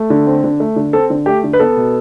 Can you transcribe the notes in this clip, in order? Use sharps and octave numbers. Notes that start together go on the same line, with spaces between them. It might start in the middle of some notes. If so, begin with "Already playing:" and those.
Already playing: A3
D3
C4
D3
A3
D3
C4 A4
D3
A3 G4
D3
B4
B3 A4
B2